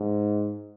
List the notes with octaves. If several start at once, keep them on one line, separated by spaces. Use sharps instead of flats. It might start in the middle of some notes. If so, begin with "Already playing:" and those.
Already playing: G#2